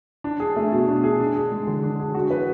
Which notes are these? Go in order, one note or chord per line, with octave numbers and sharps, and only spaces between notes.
D4
G#4
A3
B2
D4
G#4
D4
G#4
G#3
D3
D4
G#4
F#4
B4